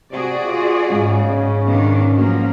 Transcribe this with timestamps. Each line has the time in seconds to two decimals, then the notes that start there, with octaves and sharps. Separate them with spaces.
0.11 C3 F#4 G#4 D5
0.46 F4
0.89 G#2 C#3 G#3
1.26 G#2 C#4
1.65 B2 D#3 D4
2.16 F3 F#3 A#3